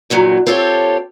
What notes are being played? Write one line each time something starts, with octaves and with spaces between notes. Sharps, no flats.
E2 G2 A#2 F#3
C4 F4 G4 A4 A#4 C#5